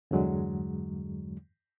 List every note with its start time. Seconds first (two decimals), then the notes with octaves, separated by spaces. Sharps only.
0.11 E2 G2 D3 F#3 G#3